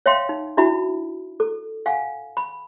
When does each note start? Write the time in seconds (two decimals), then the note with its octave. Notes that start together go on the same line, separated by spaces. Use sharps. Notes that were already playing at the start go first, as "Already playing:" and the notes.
0.06 C#5 E5 F5 G5 C6
0.29 D#4
0.57 D4 E4 F#4 E5 B5
1.40 A4
1.86 F5 F#5 G#5
2.37 B5